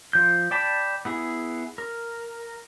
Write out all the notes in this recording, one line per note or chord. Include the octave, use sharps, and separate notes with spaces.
F3 G6
D5 G5 A5 B5
B3 E4 G#4
A#4